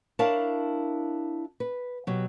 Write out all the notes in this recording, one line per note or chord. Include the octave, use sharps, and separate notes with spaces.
D4 E4 A#4 C#5 F5 A5
B4
B2 F#3 G4